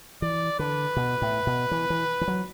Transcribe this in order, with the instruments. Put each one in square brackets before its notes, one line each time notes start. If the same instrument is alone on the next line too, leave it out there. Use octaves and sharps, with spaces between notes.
[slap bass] E3 [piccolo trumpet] D5
[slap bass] D3 [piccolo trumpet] B4
[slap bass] B2
A2
B2
E3
E3
E3
F#3